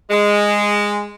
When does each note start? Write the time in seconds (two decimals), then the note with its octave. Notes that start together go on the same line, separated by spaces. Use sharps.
0.11 G#3